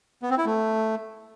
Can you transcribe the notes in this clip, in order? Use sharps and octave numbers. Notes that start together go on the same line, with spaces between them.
B3
C4
E4
A3